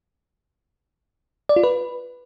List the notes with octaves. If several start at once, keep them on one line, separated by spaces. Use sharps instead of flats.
D5
F4
B4